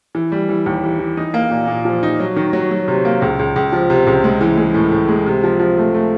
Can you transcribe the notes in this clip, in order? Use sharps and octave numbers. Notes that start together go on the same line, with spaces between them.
E3
G3
E3
D#2
E3
E3
D#4
A#3
A#2
A#2
F3
D#4
F#3
D#3
F#3
F#3
C3
A#3
C#2
C#2
C#2
F3
C3
C#2
G#3
E3
G#3
A2
A2
G#3
C3
F3
F3
A3
A3